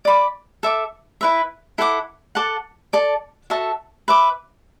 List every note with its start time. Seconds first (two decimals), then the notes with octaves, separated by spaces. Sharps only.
0.05 D5 B5 D6
0.63 A4 E5 D6
1.21 E4 B4 E5
1.78 E4 A4 F#5 D6
2.35 A4 F#5 A5 D6
2.93 A4 D5 A5
3.50 F#4 A4 E5 A5
4.08 B4 E5 D6